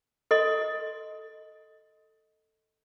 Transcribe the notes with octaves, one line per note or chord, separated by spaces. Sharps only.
A4 D#5 C6